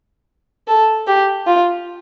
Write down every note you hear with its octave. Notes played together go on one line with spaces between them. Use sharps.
A4
G4
F4